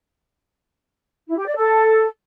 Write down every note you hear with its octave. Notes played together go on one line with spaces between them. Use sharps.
E4
G4
D5
A4